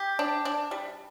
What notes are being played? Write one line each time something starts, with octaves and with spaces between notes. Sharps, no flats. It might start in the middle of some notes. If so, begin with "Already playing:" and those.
Already playing: G4
D4
D4
G3